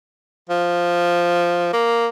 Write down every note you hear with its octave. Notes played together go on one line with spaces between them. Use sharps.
F3
A#3